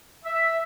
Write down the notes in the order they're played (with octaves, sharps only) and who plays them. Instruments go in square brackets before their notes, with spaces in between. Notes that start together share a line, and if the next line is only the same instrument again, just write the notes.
[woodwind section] E5